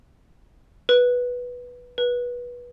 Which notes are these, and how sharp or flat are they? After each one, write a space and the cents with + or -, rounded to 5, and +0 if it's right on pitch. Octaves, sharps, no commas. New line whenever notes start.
B4 -5
B4 -20